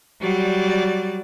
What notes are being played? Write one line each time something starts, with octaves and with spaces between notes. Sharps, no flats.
F#3 G3 D5